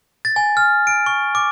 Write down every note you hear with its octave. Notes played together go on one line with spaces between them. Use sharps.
A6
G#5
F6
D7
C#6
D6